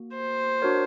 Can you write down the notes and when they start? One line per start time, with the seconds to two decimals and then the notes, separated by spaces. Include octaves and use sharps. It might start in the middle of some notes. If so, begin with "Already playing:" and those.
Already playing: A#3 F#4
0.16 C5
0.62 D4 F#4 A#4 C#5